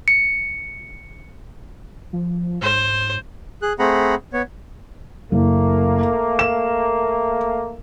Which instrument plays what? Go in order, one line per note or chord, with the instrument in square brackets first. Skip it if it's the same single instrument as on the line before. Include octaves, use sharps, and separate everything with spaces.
[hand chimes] C#7
[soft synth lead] F3
[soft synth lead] G#2 [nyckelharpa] C5
[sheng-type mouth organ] G#4 F#6
A3 C4 G#4 F#5 A#5 B5
B3 C#5
[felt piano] F#1 [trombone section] A3 A#3
[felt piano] E7